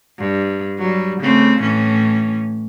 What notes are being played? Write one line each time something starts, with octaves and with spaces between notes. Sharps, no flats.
G2
F#3 G3
C#3 A3 C4
A2 E3 C#4